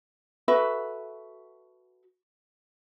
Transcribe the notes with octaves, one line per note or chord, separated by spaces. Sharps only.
F#4 A4 B4 E5